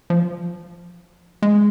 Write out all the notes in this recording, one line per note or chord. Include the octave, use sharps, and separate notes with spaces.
F3
G#3